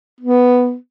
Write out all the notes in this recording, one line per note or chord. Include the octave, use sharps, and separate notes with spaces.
B3